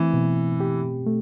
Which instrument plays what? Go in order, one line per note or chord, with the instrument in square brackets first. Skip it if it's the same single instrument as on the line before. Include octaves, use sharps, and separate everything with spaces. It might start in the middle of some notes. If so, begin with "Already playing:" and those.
Already playing: [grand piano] E3 [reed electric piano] A3 C4
[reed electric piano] B2
G4
A3